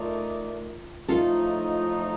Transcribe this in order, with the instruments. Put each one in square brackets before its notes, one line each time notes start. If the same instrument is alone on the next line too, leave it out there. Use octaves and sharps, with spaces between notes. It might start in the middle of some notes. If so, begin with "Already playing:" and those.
Already playing: [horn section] A3 D#4 A#4 D5 [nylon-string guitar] F4
[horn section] A2 F3 A3 D#4 [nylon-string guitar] F4 A4